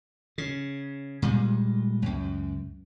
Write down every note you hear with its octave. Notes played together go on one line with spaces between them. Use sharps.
C#3
A#2 G3 G#3
C#2 F#2